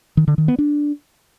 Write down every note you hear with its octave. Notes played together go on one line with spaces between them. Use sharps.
D#3
D3
D#3
B3
D4